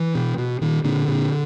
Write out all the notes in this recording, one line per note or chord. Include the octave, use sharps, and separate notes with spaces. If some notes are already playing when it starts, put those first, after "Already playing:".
Already playing: E3
B2
B2
A#2 D#3
A#2 D3
A#2